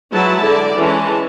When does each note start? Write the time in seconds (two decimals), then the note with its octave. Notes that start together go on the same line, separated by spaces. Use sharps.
0.12 F#3 G#3 E4 B4 A5
0.45 D3 D5
0.77 E3 G#3 C#4 A5